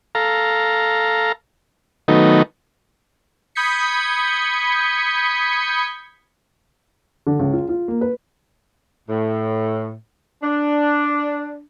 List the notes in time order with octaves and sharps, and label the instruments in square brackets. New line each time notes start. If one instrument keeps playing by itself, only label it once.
[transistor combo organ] A4 F5 A#5
D#3 F#3 A3 B3 D#4
[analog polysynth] B5 D#6 G6 G#6 B6 C#7
[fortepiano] D3
C#2
F4
F4
A#3
B4
[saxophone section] A2
D4